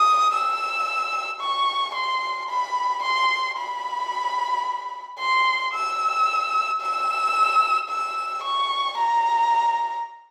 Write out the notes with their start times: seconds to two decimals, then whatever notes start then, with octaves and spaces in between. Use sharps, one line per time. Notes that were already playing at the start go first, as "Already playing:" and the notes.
Already playing: D#6
0.33 E6
1.41 C#6
1.95 C6
2.49 B5
3.03 C6
3.57 B5
5.19 C6
5.74 E6
6.82 E6
7.89 E6
8.44 C#6
8.98 A#5